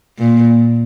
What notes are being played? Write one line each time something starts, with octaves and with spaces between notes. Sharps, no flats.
A#2